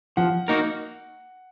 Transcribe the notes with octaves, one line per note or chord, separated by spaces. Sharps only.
F3 F#5
A#3 D#4 F#4 A#4